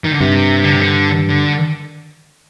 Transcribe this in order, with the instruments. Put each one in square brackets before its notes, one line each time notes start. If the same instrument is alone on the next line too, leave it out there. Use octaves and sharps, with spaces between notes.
[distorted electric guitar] D#3
D3
[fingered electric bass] G2 [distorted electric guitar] C3
[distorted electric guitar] D3
C3
D3
D3